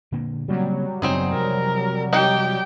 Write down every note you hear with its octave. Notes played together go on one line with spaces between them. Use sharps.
A#2 D3 A#3
C#3 F#3 G3 A#3 C4
F#2 C#3 B3 C4 D#4 G#4
C3 F3 A#4
D#3 D#4 G4 G5